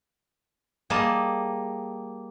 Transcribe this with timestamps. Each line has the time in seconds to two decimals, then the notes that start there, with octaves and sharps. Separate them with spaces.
0.90 G3 A#3 G#4 D#5 A5